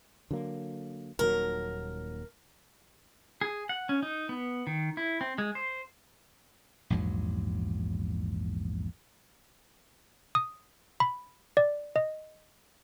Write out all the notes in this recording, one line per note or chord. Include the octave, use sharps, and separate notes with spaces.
D3 F#3 A#3
D#1 D#2 F#3 A#4
G#4
F#5
C#4
D#4
B3
D#3
E4
C4
G#3
C5
A#1 E2 G#2 F#3
D#6
B5
D5
D#5